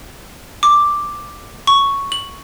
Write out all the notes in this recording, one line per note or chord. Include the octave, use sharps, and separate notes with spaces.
D6
C#6
F#7